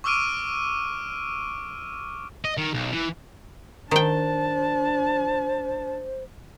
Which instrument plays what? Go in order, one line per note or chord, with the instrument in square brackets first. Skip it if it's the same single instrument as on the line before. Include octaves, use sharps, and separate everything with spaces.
[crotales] C#6 D6 E6 F6 D7 D#7
[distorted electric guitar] D#5
D#3
B1
E3
[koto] D#3 G5 [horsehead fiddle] D4 A5 [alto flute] C5